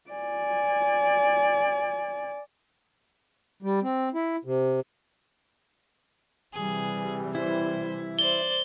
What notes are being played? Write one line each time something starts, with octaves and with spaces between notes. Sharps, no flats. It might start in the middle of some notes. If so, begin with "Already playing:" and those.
D5 G#5
G3
C4
E4
C3
C3 E3 G3 G#4
E4 C5
C5 D5 G7